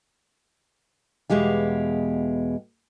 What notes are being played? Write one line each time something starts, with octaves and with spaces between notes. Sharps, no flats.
E2 B2 G#3 G4 F5